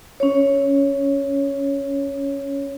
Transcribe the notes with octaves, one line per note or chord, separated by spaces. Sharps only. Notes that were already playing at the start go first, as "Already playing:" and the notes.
C#4 C#5